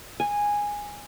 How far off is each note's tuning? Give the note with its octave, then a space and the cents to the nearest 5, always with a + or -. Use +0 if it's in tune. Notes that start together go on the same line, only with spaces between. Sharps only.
G#5 -10